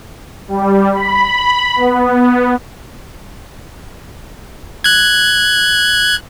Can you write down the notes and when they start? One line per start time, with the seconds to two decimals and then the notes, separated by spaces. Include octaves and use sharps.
0.48 G3
0.93 B5
1.76 B3
4.84 F#6 G#6